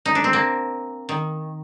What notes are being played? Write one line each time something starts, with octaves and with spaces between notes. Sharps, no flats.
D#4
D4
C4
A#3
D#3